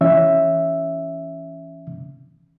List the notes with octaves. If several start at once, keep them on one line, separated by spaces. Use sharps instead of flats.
E3 C#4 E5